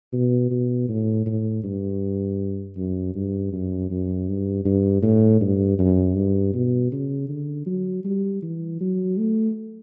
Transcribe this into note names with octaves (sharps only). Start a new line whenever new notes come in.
B2
B2
A2
A2
G2
F#2
G2
F#2
F#2
G2
G2
A2
G2
F#2
G2
B2
C#3
D3
F#3
G3
E3
F#3
A3